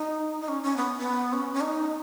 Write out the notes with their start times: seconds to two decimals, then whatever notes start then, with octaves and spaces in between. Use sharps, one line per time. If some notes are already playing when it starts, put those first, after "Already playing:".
Already playing: D#4
0.41 D#4
0.48 C#4
0.63 C#4
0.76 B3
0.99 B3
1.33 C#4
1.54 C#4
1.61 D#4